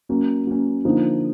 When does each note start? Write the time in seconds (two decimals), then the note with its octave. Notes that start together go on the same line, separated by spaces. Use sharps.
0.09 F#3 A#3 C#4
0.47 F#3 A#3 C#4
0.85 D3 F3 A#3 D#4